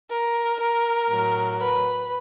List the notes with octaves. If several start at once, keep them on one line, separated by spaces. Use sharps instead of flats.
A#4
A#4
A2 F#3
B4